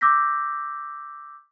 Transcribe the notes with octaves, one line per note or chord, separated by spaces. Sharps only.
D6 E6 G6 A#6 B6